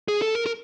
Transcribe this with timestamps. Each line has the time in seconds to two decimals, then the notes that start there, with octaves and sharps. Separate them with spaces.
0.08 G#4
0.22 A4
0.35 A#4
0.46 A#4